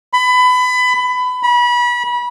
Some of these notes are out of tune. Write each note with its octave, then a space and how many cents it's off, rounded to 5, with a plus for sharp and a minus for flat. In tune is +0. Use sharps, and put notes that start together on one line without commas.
B5 +25
B5 -30